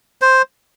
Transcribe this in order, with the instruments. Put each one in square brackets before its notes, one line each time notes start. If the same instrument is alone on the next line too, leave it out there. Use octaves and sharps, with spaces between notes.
[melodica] C5